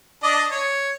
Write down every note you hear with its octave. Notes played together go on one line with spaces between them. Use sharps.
D4 D5 D#5
C#5